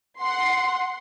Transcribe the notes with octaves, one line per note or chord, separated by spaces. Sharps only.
F#5 C6